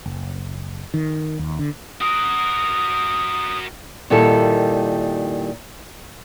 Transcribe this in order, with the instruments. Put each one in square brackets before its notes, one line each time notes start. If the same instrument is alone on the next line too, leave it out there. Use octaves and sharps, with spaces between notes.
[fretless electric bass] F#1
D#3
D#2
D3
[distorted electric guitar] F#4 A#4 [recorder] D#6
[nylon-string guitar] A#2 D#3 G3 E4 F4 A4